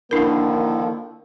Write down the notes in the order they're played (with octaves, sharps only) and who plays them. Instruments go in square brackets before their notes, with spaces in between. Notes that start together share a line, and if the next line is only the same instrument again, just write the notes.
[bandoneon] D3 D#3 F3 [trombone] A#3 [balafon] D4 A#4 [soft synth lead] E4